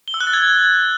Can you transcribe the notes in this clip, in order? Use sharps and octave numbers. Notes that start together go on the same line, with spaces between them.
G7
E6
F#6
A6
G#6